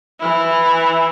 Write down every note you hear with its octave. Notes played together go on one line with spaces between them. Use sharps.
E3 E4